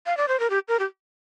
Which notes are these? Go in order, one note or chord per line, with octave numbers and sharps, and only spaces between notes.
F5
D5
C5
A#4
G4
A#4
G4